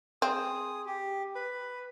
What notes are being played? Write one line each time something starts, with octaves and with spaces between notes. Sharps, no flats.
C4 G#4 D#6
G4
B4 B5